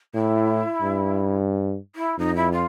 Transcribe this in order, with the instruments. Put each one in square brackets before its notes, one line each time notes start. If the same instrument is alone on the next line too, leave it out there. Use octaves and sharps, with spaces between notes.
[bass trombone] A2 [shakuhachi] E4
[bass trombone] G2
[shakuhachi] E4
[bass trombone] F2 [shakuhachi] D#4
[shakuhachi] E4
F4